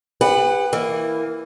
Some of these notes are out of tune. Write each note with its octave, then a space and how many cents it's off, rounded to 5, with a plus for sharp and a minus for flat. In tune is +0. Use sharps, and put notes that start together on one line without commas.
G4 +45 B4 +5 F#5 +0
E3 +0 A#3 +0